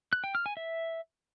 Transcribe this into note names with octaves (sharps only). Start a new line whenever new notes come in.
F#6
G5
F6
G#5
E5